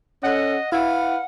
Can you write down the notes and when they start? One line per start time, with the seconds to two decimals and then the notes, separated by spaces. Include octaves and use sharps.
0.23 C#4 A4 D#5 F#5
0.72 E4 B4 F5 F#5